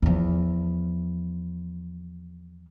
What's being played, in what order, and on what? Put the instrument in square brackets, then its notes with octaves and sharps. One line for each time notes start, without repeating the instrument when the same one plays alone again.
[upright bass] E2 F3